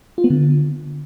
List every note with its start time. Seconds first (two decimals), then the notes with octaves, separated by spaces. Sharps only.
0.18 F4
0.24 B3
0.30 D3